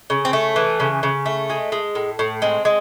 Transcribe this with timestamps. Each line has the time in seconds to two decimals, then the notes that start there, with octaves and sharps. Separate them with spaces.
0.10 C#3
0.25 C4
0.33 A3
0.56 E3
0.80 C#3
1.03 C#3
1.26 A3
1.50 G#3
1.72 G#3
1.95 A2
2.19 A2
2.42 G#3 C4
2.65 G#3